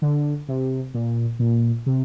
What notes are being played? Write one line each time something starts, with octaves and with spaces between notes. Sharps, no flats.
D3
C3
A#2
A#2
C3